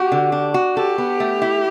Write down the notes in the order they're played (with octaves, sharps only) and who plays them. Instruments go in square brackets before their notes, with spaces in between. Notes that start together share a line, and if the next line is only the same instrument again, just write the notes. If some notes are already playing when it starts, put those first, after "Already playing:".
Already playing: [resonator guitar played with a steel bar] F#4 [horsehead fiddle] G4
[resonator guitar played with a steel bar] D3
D4
F#4
[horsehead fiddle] G4 [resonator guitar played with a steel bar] A4
[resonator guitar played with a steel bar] B3
A3
E4